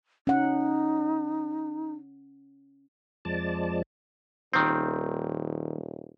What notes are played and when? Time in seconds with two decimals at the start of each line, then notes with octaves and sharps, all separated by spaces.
0.27 C#4 D#4 F#5
3.25 F2 F3 G#3 D5 A5
4.53 D#1 D#3 C4